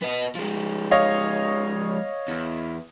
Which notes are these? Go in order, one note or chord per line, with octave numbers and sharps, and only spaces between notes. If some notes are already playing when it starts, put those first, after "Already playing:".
B3 D#5
F3 G#3
C#5 D#5 F5
E2